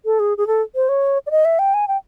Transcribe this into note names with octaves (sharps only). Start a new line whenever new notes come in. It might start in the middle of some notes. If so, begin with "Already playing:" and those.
A4
G#4
G#4
A4
C5
C#5
D5
D#5
E5
G5
G#5
G5